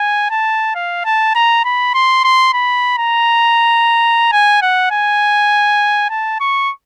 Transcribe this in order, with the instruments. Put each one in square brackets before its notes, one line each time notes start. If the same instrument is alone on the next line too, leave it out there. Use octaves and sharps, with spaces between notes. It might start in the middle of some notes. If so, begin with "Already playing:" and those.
Already playing: [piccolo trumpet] G#5
A5
F5
A5
A#5
B5
C6
C6
B5
A#5
G#5
F#5
G#5
A5
C#6